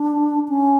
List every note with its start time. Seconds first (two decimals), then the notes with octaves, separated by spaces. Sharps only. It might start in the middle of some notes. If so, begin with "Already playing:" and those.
Already playing: D4
0.49 C#4